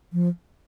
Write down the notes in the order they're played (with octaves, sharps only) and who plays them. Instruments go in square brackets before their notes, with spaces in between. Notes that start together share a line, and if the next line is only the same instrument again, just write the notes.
[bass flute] F3